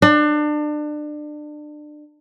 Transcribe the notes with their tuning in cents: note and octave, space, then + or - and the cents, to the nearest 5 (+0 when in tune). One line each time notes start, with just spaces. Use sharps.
D4 +30